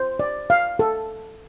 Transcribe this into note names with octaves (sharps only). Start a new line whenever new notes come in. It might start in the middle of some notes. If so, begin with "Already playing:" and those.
Already playing: C5
D5
F5
A4